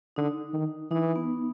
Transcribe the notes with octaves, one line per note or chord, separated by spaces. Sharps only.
D3 D#4
D#3
E3 D#4
B3